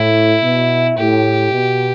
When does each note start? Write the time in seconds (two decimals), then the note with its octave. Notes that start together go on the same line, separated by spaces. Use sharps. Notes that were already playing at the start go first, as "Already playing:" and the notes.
Already playing: A2 E4
0.43 B2
0.98 A2 G4
1.52 B2